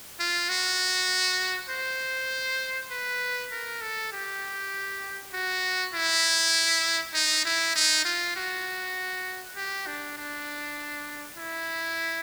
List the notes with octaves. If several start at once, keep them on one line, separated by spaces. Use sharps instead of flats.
F4
F#4
C5
B4
A#4
A4
G4
F#4
E4
D#4
E4
D#4
F4
F#4
G4
D4
D4
E4